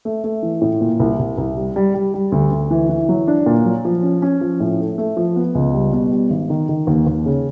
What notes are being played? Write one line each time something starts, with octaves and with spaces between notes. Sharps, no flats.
A3
A3
E3
A2
A#2
C2
C2
C2
G3
G3
G3
G3
D2
D2
E3
E3
F#3
D4
A#2
F#3
F3
C#4
C#4
F3
A2
A3
A3
F3
B3
C#2
G3
B2
G3
G#1
D#3
D#3
D#2
D#2
C#3